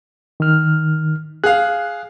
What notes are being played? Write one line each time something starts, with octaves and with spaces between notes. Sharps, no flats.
D#3 F6
G#4 F5 F#6